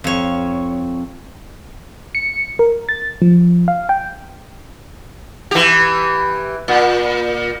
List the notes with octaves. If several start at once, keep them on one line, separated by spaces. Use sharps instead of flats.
F2 C#5
C#7
A#4
A6
F3
F5
G5
E3 G4
A#2